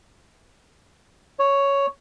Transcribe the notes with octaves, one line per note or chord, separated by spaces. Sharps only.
C#5